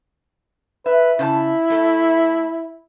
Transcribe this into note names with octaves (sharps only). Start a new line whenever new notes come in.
B4 E5
C#3 E4 C5 A5
A3 A4